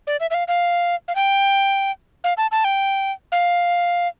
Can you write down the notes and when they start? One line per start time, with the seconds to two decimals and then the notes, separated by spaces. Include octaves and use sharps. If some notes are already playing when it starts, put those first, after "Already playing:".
0.07 D5
0.20 E5
0.30 E5
0.34 F5
0.48 F5
1.08 F5
1.15 G5
2.24 F5
2.37 A5
2.52 A5
2.64 G5
3.32 F5